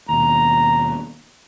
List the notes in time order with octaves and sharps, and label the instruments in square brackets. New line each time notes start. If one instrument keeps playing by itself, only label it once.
[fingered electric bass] D#2 B2 [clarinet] A#5